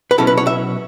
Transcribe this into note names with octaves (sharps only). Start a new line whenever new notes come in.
B4
B2 F#3 C#4 E4 A4
B4
C#5
E5